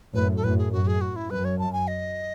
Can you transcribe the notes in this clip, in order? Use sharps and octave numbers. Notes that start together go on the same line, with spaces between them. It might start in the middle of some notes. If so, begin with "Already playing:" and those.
F#2 A2 B4
A4
F#2 A2 B4
G#4
F#2 F#4
G#4
F#4
E4
F#2 B4
C#5
A5
G#5
D#5